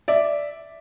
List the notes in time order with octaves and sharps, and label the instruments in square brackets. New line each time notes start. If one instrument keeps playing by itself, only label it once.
[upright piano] D5 E5